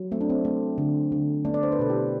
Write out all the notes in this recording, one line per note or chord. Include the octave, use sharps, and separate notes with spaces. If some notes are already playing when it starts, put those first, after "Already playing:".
Already playing: F#3
A3 C4
D4
C4
A3 C4
D3
D3
A3 B3 D4
D5
C5
B4
B2 A4
E4 G4